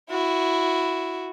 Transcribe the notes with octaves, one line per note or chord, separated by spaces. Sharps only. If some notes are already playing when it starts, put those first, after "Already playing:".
E4 F#4